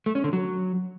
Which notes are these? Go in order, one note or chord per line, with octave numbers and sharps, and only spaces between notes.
A3
C#4
D3
F#3